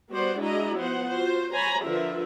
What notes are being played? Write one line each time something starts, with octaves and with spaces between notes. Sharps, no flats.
G3 B3 F#4 C5 D5 F#5
G#3 D4 E4 F#4 D#5 A#5
F3 B3 C5 F#5
F4 F#4 C5
C5 C#5 G#5 A#5 B5
D3 F3 F4 A#4 B4 E5